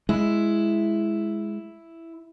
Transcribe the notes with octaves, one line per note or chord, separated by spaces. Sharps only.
G#3 E4